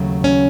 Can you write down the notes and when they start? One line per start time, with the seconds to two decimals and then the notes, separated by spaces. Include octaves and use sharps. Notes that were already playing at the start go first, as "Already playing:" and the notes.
Already playing: D#2 C#3 F#3 A3
0.24 C#4